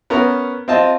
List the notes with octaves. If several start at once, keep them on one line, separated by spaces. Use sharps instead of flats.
B3 C#4 A#4 A#5
C4 F4 D#5 A5